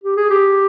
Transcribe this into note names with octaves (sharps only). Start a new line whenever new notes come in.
G4
G#4
G4